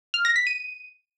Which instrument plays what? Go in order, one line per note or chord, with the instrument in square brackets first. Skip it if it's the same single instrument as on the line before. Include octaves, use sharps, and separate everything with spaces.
[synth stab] F6
A#6
B6
D#7